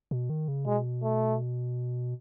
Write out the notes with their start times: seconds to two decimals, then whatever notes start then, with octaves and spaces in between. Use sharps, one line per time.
0.11 B2
0.30 D#3
0.48 C#3
0.66 B2 G#3
1.03 A3